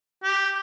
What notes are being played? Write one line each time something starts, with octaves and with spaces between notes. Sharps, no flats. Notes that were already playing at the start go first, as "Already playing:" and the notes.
G4